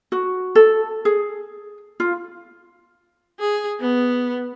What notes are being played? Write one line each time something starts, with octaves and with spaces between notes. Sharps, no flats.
F#4
A4
G#4
F4
G#4
B3